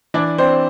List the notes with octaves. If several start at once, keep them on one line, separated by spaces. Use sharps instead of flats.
E3 D4 D5
C4 D4 C5